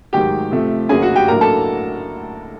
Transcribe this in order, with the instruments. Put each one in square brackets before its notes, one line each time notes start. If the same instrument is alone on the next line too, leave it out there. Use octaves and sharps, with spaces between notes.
[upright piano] G#2 D#3 F#3 G4 G5
C3 F3 A3
F#2 D3 F#3 A#3 C#4 G#4 G#5
F#4 F#5
G4 G5
A2 F#3 A#3 D4 A#4 A#5
A4 A5